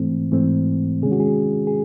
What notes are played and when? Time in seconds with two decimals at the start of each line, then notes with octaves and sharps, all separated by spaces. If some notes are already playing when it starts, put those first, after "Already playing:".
Already playing: G#2 E3 A3 C4
0.32 G#2 E3 A3 C4
1.02 C3 D#3 G#3 C#4 G#4
1.12 F#4
1.20 G#4
1.67 G#4